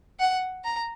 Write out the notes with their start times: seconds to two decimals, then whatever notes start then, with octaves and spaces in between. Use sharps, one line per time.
0.20 F#5
0.64 A#5